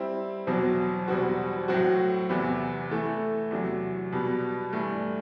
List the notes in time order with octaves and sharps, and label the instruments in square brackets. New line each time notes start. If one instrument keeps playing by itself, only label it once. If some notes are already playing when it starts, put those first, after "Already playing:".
Already playing: [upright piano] G3 C4 E4
E2 B2 F#3 C4
E2 B2 G3 C4 F#4
A2 F#3 C4 F#4
E2 C3 E3 B3
E3 A3 E4 A4
E2 C3 F#3
B2 G3 B3
G2 E3 A3